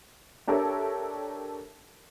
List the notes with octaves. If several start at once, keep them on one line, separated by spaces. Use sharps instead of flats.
D4 G4 A4 A#4 C#5 E5